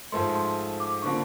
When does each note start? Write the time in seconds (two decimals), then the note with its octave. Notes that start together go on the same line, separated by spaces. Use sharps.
0.12 G#2 F3 A3 C6
0.35 C6
0.80 D6
1.02 D3 F3 A#3 C#6